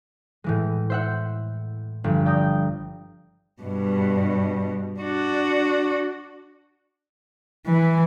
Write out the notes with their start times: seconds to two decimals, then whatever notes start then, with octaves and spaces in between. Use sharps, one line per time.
0.44 A2 E3 G#3
0.90 C5 E5 F#5
2.04 G1 F3
2.25 D5 G5 A#5 D#6
3.62 G2 B2
5.01 D4 F#4
7.67 E3